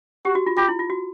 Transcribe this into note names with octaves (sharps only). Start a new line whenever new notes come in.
F#4 G4
F#4
F4
F4 G4
E4
F4
F#4